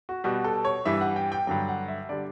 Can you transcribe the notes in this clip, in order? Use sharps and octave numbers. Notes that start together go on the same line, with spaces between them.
F#4
B2 G3 F#4
A4
C#5
G2 E3 G3 E5
F#5
G5
G5
G2 D3 F#3 G5
F#5
E5
D3 G3 D5